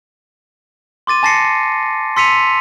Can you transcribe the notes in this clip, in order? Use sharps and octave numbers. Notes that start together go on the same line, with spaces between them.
C6 D6 A6 D#7
G#5 A5 A6 A#6 C7 C#7
C6 E6 B6 C#7 D#7 F7